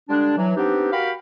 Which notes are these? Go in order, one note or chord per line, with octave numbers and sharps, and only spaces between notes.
D3 G3 G#3 D4
E3 F#3
B3 C4 D4 D#4 G4
F#4 G4 A#4 F5 G5 B5